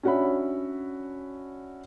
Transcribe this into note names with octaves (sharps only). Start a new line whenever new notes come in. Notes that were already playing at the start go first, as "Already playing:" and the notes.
C#4 D4 F#4 C#5 E5 B5